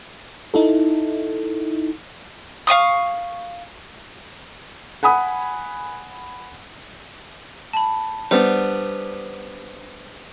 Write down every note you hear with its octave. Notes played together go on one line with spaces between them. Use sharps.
D#4 E4 A4
F5 G#5 C#6 D#6
F#5 G#5 B5 D#6
A5 B5
G3 B3 D4 C5